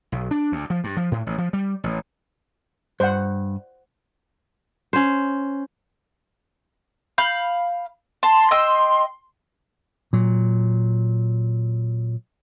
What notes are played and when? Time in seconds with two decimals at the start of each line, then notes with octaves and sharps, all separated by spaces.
0.12 B1
0.31 D4
0.52 D2
0.70 F3
0.84 G2
0.97 F3
1.12 A2
1.27 A1
1.38 F3
1.53 G3
1.84 A1
3.00 G2 C5 F#5
4.93 C#4 C5
7.18 F5 B5 G6
8.23 A5 C6
8.51 D#5 G5 E6
10.13 A#2 F#3